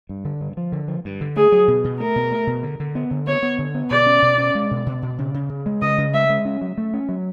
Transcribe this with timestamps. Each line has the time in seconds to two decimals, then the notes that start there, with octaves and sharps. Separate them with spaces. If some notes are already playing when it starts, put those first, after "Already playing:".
0.09 G2
0.25 D3
0.41 G2
0.57 F3
0.72 D3
0.88 F3
1.05 G2
1.21 D3
1.36 A3 G#4
1.52 F#3
1.68 B2
1.84 B2
2.00 A3 A#4
2.16 B2
2.31 A3
2.47 B2
2.63 D3
2.80 D3
2.95 B3
3.11 D3
3.27 B3 C#5
3.43 B3
3.58 D3
3.75 B3
3.91 B2 D5
4.06 C#4
4.22 B2
4.38 C#4
4.55 G#3
4.71 B2
4.86 B2
5.02 B2
5.18 C#3
5.34 C#3
5.49 C#3
5.66 G#3
5.82 C#3 D#5
5.98 C#3
6.14 G#3 E5
6.30 G#3
6.45 C#4
6.61 F#3
6.78 A3
6.94 C#4
7.09 F#3